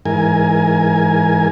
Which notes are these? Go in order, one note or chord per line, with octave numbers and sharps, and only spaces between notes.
G#2 E3 A#4 G#5